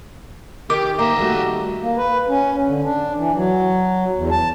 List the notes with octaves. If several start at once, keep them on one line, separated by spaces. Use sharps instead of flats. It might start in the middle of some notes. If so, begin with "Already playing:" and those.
D#3 G4 D6
A#3 D#5 E5
G3 A3 F#4
A#3
B4
C#4
D3
D4
E3
F#3
E2
A5